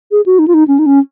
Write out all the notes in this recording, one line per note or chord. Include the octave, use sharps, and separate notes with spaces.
G#4
F#4
D#4
F4
D#4
C#4
D#4
C#4